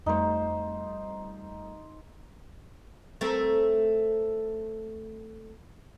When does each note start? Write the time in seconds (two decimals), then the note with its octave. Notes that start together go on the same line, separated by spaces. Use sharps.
0.06 F2 G3 A3 D#4 C5
3.21 A3 C4 A#4